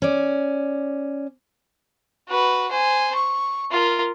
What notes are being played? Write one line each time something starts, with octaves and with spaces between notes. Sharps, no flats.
C#4 D5
F#4 B4
C5 G#5
C#6
F4 A#4